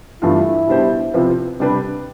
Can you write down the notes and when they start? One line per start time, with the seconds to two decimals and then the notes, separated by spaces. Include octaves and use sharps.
0.22 G2 E3 A3 D4 E4 F4
0.67 B2 G3 D4 G4 C5
1.13 C3 F3 C4 F4 B4
1.60 C3 G3 D4 G4 B4